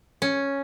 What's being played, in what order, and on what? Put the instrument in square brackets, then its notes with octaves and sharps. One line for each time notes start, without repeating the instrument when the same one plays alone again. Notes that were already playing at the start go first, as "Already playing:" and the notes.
[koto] C#4